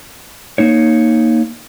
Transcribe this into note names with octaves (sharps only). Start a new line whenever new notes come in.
A#3 D#4 C#5